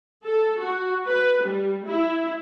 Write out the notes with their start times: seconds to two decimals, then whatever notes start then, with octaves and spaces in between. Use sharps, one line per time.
0.24 A4
0.59 F#4
1.07 B4
1.43 G3
1.86 E4